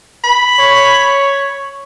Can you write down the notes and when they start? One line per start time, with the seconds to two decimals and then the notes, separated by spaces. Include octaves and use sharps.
0.24 B5
0.59 C#5